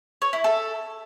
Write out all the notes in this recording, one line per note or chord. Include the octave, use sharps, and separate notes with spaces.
C#5
E4
A4